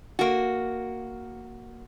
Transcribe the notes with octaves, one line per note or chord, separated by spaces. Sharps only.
A#3 F#4